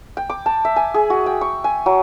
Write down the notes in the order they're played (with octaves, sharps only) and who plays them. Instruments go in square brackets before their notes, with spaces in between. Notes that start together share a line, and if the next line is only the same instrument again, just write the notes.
[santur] G5
D6
A5
E5
G#5
G#4
F#4
G5
C#6
G#5
F#3